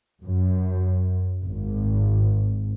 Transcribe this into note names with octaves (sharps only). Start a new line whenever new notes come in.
F#2
G#1